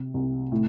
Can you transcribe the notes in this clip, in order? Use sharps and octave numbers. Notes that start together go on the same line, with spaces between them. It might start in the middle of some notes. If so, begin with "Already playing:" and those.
Already playing: C3
C2
A2